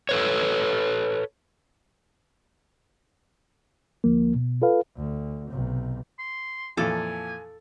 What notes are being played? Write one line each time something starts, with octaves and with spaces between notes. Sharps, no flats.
A4 B4 C#5
D2 F3 A#3
B2
F4 A4 B4 F5
D2
B1 C3
C6
F2 A#2 E3 A4 G#5